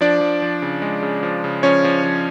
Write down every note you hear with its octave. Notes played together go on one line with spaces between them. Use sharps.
F3 D4 D5
F3
F3
C#3
G#3
C#3
F3
C#3
F3 C#4 C#5
F3
F3